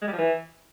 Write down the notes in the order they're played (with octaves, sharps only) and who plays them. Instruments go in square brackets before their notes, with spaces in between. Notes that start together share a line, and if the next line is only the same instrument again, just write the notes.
[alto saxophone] G#3
G3
F3
E3